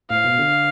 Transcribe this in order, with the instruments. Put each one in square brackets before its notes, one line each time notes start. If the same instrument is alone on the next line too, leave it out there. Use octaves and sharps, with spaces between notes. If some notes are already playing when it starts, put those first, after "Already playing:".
[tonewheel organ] A2 [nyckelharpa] F5
[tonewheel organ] B2
D3